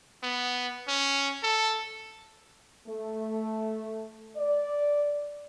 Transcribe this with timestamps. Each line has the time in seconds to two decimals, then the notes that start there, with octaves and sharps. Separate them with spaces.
0.23 B3
0.88 C#4
1.43 A4
2.87 A3
4.36 D5